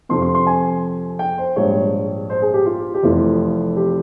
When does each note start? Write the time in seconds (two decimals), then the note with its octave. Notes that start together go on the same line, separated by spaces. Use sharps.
0.09 F2 C3 F3 C4 C6
0.22 C6
0.35 C6
0.47 G#5
1.19 G5
1.38 C5
1.56 A#1 G#2 G3 C#5
2.30 C5
2.42 G#4
2.54 G4
2.66 F4
2.94 G4
3.03 F1 F2 E3 F4
3.76 G4